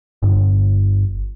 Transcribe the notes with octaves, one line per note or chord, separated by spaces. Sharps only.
G1